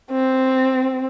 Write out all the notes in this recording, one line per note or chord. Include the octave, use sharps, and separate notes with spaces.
C4